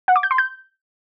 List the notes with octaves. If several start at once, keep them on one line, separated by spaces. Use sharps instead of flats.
F#5
D6
G6
C6
G6